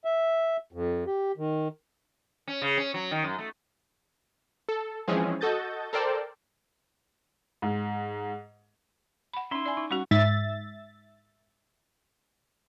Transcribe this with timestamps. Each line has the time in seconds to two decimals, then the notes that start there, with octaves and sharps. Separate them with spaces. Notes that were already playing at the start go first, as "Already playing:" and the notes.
0.05 E5
0.73 F2
1.07 G4
1.37 D#3
2.47 C#4
2.62 C#3
2.78 C#4
2.94 F#3
3.11 D#3
3.24 F#2
3.39 A3
4.69 A4
5.08 E3 F3 G#3 C4 C#4 G#4
5.41 F#4 A4 D#5 G6 A6
5.93 A4 A#4 C5 D5 G5 A5
7.62 G#2
9.33 F#5 B5
9.51 C#4 D#4 E4 C6
9.66 D5 G#5
9.77 D#4
9.91 G3 C#4 F#4 F#5 C#6
10.11 G#2 E5 A6